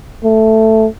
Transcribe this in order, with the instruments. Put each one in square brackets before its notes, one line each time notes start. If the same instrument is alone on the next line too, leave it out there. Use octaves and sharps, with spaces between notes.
[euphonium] A3